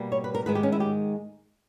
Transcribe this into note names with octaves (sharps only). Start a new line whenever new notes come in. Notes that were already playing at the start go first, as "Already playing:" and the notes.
Already playing: B2 G3 A#3
C#5
B4
A#4
G#2 D#3 G#3 B4
G4
C#4
E4
G4